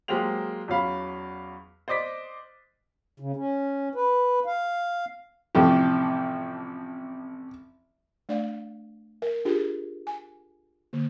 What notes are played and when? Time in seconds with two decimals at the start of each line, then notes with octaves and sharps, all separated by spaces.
0.08 F#3 G#3 A#3 G4 C5 F7
0.68 E2 F#3 C#4 F5 B5
1.88 C5 D5 D#5 D6 B6
3.20 C#3
3.36 C#4
3.95 B4
4.46 F5
5.55 A1 C3 F3 A3 G4
8.29 A3 D4 D5 F5
9.22 A#4
9.45 D4 F4 G4 G#4
10.07 G#5
10.93 D3 A#3